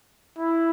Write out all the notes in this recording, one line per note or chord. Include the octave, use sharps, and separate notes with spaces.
E4